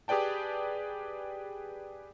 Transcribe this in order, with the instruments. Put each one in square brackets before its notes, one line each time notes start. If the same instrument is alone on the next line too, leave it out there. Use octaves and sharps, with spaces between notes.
[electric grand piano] G4 G#4 B4 D5 G5 A5